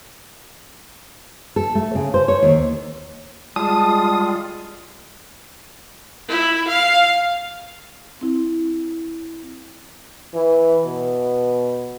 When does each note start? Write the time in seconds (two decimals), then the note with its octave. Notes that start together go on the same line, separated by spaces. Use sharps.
1.56 A4
1.75 A3
1.95 C#3
2.14 C5
2.28 C#5
2.43 D#2
3.56 G3 G#3 F4 A5 D#6
6.29 E4
6.69 F5
8.21 C4 E4
10.34 E3
10.85 B2